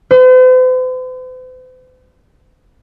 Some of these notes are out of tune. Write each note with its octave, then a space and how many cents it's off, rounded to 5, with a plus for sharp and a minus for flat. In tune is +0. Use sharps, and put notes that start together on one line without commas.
C5 -45